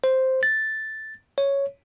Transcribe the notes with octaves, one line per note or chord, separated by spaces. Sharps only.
C5
A6
C#5